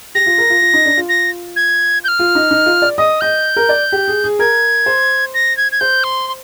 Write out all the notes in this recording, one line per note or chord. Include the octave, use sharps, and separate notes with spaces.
G4 A#6
F4
A#4
F4
F4
D#4
D4
F4
A#6
G#6
G6
F6
F4
D#4
D#4
F4
D5
D#5 D#6
D#5 G6
A#4
D5
G4
G#4
G#4
A#4 G#6
C5
A#6
G#6
G#6
C5 G6
C6
C6